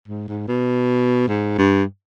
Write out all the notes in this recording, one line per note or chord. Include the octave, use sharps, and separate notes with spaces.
G#2
G#2
B2
G#2
G2